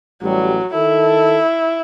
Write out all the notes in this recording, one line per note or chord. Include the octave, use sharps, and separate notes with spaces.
A1 F#3 G3
D#3 E4 A4